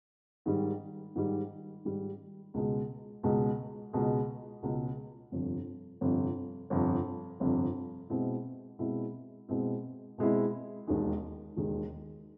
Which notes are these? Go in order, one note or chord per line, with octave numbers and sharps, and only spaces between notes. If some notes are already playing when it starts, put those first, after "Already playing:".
G#2 D#3 G3
G#2 D#3 G3
G#2 D#3 G3
C#2 B2 G#3
C#2 B2 G#3
C#2 B2 G#3
C#2 B2 G#3
G1 F2 C3
G1 F2 C3
G1 F2 C3
G1 F2 C3
B2 G#3 C4 E4
B2 G#3 C4 E4
B2 G#3 C4 E4
B2 G#3 C4 E4
E1 D#2 D#3 G#3
E1 D#2 D#3 G#3